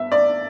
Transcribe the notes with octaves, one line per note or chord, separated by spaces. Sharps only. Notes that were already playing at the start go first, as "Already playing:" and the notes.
Already playing: G2 B3 E5
D5